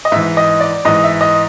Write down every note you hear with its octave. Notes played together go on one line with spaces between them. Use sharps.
D#5
G#2 E3 E5
D#5
D5
G#2 E3 D#5
E5
D#5